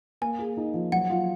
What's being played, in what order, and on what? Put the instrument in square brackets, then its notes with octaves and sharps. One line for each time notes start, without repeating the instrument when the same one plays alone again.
[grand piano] A#3 [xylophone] G#5
[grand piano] G#4
D#4
F3
[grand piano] F#3 [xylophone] F#5
[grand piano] F4